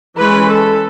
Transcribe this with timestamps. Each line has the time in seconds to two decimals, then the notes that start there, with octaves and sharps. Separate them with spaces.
0.18 E3 G#3 C#4 B4
0.48 A4